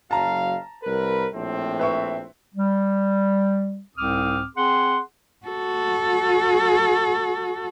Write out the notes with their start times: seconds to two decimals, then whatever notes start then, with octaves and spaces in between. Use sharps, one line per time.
0.11 F#1 F#3 F5 A5 A#5
0.84 C2 A#4 B4
1.34 A#1 A2 C4
1.79 B4 E5 C#6
2.55 G3
3.97 C2 G#2 C4 D6 D#6 F6
4.56 C4 G#4 F#5 C6
5.47 F#4 A4